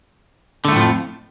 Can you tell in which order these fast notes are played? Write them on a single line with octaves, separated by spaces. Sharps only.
D3 A3 A2 F3 F2